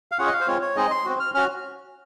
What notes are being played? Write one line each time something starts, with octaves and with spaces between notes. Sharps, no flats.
F5
C#4 F4 G#4 F#5
D#5
F5
C5
G#3 C4 F4 C#5
C#5
G#3 C4 D#4 G#4 D#5
C6
C4 F#4
F6
C#4 F#4 F6